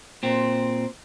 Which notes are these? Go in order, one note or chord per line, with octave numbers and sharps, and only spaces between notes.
A#2 C4